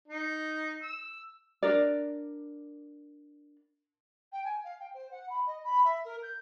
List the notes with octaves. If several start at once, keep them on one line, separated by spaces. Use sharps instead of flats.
D#4
E6
D4 A#4 D5
G5
G#5
F5
G5
C5
F#5
B5
D#5
B5
E5
A#4
G6